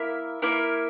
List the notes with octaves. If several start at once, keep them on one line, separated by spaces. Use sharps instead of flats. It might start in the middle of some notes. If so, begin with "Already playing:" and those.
Already playing: A#3 E4 A#4 E5
A#3 E4 A#4 E5